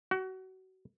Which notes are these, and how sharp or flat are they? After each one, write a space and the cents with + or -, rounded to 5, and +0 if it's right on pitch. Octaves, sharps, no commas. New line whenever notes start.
F#4 +25